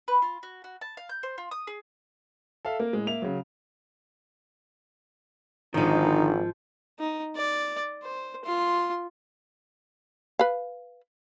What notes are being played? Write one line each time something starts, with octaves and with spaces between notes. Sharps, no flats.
B4
F4
F#4
F#4
A5
F5
G6
C5
F4
D#6
G#4
A4 E5 F5
A#3 A#4
A2 G#3
A#3 E5 F7
C#3 F#3
G#1 G#2 D3 D#3 F3 D#4
D#4
D5
C5
F4 C6
B4 F5